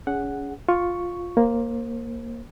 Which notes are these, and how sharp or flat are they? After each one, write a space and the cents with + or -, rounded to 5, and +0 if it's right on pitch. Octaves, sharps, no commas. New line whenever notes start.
C#4 +30 G#4 +0 F#5 +0
F4 +10 C#6 +0
A#3 +0 C5 +30